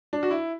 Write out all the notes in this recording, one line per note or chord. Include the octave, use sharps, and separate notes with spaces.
D4
F#4
E4